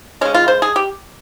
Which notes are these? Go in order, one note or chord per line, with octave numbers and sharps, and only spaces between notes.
C#3 G#3 C#4
F4
C5
G#4
G4